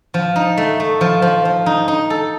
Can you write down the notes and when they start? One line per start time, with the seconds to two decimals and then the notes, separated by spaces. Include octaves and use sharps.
0.14 F3
0.36 D#4
0.57 A3
0.80 A3
1.01 F3
1.22 F3
1.45 F3
1.66 D#4
1.88 D#4
2.10 A4